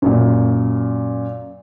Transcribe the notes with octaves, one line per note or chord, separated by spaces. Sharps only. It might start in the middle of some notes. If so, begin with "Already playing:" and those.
F#2 A#2